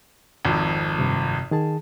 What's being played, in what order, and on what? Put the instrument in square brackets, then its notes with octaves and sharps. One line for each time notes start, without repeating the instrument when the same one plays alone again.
[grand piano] G#1 F2
[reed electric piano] G2 C3
D#3 G#4 A5